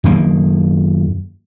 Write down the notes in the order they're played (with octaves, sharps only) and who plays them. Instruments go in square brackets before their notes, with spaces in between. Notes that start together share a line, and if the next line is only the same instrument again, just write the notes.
[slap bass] F#2 D#3 A#3